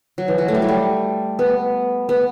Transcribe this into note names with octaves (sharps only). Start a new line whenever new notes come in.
F#3
E3
F#3
A3
G3
F#3
G3
B3
B3